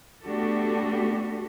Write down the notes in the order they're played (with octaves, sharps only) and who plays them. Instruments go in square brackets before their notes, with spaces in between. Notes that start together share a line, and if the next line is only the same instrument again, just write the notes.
[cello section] A3 B3 D4 F#4 G4 A4